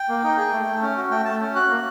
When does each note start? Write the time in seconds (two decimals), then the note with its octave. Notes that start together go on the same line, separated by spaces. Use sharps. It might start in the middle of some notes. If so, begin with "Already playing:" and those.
Already playing: G5
0.09 A#3
0.24 D#4
0.38 G#4
0.52 A3
0.67 A3
0.82 C#4
0.97 F#4
1.11 A3 G5
1.25 A3 A5
1.40 C#4
1.55 F#4 F#6
1.70 A#3